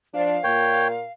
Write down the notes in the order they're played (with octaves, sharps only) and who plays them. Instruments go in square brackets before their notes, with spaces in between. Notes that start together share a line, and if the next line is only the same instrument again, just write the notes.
[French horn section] F3 D4 [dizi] F5
[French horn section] A#2 A#4 [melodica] C#5 G5